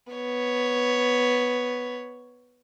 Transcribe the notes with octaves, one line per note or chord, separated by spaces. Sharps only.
B3 C#5